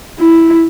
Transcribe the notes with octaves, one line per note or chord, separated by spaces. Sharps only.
E4